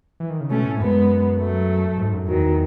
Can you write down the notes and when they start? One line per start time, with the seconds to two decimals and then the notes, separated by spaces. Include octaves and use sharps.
0.20 E3
0.30 D#3
0.41 C#3
0.50 B2 A3 C#4
0.65 A2
0.79 F#2 G#3 B3
1.38 F#3 A3
1.98 G#2
2.13 F#2
2.27 E2 D#3 F#3